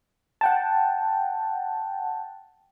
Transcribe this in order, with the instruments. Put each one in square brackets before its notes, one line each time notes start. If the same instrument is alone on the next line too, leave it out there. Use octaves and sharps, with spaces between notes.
[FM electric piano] F#5 G5 A5